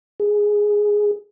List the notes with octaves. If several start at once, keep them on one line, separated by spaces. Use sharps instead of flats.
G#4